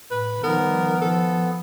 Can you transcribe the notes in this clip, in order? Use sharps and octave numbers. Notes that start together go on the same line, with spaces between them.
A2 B4
D#3 F3 G3 B3 A#4
F3 A4